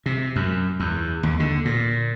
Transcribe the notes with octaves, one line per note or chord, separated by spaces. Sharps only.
C3
F#2
E2
D#2
D3
A#2